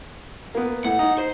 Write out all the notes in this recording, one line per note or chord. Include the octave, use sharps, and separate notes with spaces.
A#3 B3
A2 F#5
D#4
C5